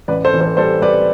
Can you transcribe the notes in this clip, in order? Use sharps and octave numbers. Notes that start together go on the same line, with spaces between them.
A1 B4 D5
A4 C5
E3
A4 C5
G3 A4 C5
G3 B4 D5